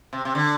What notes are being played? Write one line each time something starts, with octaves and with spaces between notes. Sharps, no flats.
C3
C3
D3